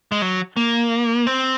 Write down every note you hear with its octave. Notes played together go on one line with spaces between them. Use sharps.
G#3
F#3
A#3
C4